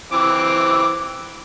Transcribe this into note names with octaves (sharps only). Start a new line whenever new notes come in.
E3 C4 D6